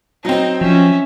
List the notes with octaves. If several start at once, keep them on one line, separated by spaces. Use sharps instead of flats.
F#3 C4 D#4
F3 C#4 E5